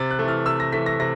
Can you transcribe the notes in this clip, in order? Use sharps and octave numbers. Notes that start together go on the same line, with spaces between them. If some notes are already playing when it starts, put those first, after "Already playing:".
Already playing: C3 A6
F#6
A3
E3 F6
C3 E6
A#6
E3 A3 B6
A#6
C3 A#6